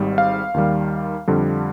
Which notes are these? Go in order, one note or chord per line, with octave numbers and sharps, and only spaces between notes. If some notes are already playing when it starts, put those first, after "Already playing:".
Already playing: G#1 G#2 G3
F5
D#2 D#3 G3
F2 D3 G3